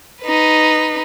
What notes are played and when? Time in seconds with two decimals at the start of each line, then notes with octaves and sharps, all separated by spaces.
0.22 D#4 B4